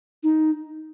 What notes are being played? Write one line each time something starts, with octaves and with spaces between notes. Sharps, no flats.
D#4